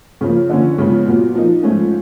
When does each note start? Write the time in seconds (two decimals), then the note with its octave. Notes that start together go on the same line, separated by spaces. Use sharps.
0.21 C#3 F3 A#3
0.49 D3 F3 A#3 C#4
0.78 C#3 F3 G#3 B3
1.06 A#2 F#3 B3
1.35 F3 A#3 D#4
1.63 G#2 F3 A3 C#4 F4